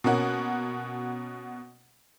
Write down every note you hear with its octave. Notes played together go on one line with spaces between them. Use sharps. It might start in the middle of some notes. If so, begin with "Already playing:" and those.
B2 A#3 C#4 F#4